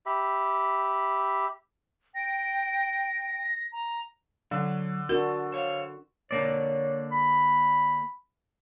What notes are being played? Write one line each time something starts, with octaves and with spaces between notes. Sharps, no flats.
G4 E5 B5
G5 A#6
A#5
D3 F#3
D4 F#4 A4 A#4
C5 C#5 F5
D3 A#3 C#5 D5
B5